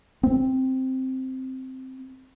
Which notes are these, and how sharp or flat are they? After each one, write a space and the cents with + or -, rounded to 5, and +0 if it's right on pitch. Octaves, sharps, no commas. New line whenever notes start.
C4 +0